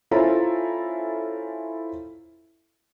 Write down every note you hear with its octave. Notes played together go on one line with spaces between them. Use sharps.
C#4 E4 F4 A4 C5 A#5